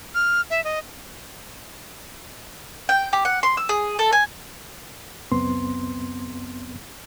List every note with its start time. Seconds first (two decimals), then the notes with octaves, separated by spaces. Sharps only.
0.15 F6
0.50 E5
0.64 D#5
2.89 G5
3.13 G4
3.25 F#5
3.43 C6
3.57 E6
3.69 G#4
3.99 A4
4.12 G#5
5.32 C#2 F#2 B3 C4 C6